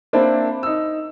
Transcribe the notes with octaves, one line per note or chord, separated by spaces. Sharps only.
A#3 C4 D4 E4 A5
D#4 E6